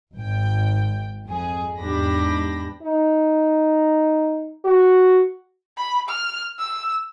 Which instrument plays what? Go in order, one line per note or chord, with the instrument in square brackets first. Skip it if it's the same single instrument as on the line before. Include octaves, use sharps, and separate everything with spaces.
[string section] G#1 G5
F2 G#4
E2 G#2 D4 G4 B5 A#6
[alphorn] D#4
F#4
[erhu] B5
F6
E6